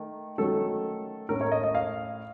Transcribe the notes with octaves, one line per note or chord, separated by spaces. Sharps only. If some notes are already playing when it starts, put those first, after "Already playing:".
Already playing: D#3 A3
D#3 F#3 A3 C#4 A4
A2 A3 C#4 A#4
C#5
D#5
D#5
F5